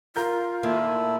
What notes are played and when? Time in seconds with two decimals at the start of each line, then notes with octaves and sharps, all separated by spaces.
0.16 F4 A#4 G6
0.63 A#2 D#3 A3 A#3 E4